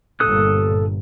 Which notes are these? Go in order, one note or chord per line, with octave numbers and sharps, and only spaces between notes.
G1 A#2 A4 D#6 F#6